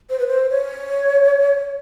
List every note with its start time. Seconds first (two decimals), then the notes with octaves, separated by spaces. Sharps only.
0.10 C5
0.19 B4
0.27 C5
0.50 C#5